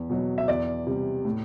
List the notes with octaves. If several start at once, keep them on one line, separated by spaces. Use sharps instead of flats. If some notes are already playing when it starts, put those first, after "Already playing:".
Already playing: E2
B2 F#3
E5
E2 D5
C3 G3
A2